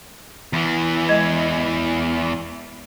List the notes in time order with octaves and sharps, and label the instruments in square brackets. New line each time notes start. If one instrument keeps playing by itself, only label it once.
[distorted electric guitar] E2 E3
[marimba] G#3 D#5 G#6